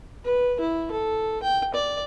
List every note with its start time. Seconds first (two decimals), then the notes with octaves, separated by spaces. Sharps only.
0.24 B4
0.60 E4
0.91 A4
1.43 G5
1.74 D5